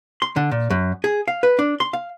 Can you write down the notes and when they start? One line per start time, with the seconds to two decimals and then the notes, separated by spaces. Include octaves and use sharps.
0.22 C6
0.36 D3
0.51 A#2
0.70 F#2
1.04 G#4
1.28 F5
1.43 B4
1.59 D4
1.80 C6
1.93 F5